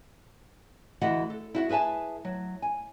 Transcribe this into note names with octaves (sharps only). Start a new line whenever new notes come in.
D2 E3 F#4 D#5 F#5
A4
E4 F#4 E5
G#4 B4 E5 G#5 A5
F#3
G#5